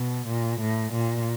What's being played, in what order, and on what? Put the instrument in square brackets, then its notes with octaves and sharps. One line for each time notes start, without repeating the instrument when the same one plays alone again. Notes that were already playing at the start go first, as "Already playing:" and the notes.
Already playing: [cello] B2
A#2
A2
A#2